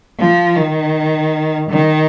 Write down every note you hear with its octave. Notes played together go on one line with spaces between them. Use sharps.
F3
D#3
D#3